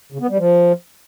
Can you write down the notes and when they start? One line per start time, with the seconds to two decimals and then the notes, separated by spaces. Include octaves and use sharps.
0.12 C#3
0.21 B3
0.29 G3
0.38 F3